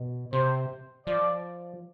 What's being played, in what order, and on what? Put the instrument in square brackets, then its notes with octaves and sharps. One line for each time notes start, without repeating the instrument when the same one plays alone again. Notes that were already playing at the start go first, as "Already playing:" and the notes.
Already playing: [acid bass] B2
[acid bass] C3 [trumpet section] C5
[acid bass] F3 [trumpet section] D5